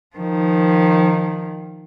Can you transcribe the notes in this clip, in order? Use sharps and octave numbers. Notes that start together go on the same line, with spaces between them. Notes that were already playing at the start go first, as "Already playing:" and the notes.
D#3 F3